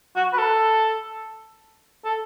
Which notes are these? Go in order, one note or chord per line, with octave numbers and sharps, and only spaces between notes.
F#4
B4
A4
A4